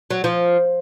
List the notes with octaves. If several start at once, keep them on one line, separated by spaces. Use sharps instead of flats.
F#3
F3